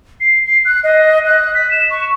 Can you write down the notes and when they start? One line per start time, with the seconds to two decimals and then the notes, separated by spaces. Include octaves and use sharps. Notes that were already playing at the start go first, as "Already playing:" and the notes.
0.20 C7
0.47 C7
0.65 F#6
0.84 D#5
1.26 F#6
1.55 B6
1.71 E7
1.90 C#6